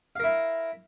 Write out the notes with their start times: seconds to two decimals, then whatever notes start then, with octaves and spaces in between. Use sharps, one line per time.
0.16 F5
0.20 A#4
0.24 E4